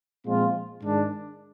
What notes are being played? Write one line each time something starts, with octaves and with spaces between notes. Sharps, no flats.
A#2 F3 G#3 C4 F4
G#2 D#3 G#3 D4